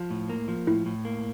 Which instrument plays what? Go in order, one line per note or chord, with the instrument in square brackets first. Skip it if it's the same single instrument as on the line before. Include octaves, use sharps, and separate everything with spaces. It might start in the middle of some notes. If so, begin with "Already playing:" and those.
Already playing: [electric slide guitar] F3 [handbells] F4
[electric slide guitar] A2
A#3
F3
[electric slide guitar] A2 [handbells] E4
[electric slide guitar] A2
A#3